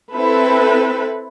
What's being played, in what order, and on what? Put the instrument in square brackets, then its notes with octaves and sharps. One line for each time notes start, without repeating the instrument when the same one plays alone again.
[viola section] C4 E4 A4 B4